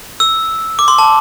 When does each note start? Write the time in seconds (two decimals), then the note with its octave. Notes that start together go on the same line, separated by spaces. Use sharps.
0.20 E6
0.79 D6
0.88 C6
0.98 A5